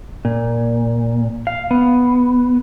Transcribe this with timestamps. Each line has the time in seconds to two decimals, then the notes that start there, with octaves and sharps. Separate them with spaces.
0.25 A#2
1.47 F5
1.71 B3